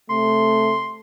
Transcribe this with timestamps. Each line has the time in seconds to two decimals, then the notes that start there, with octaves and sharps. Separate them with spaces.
0.10 C3 A3 C6